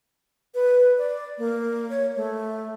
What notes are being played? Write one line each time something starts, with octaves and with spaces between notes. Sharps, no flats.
B4
D5
A#3
C#5
A3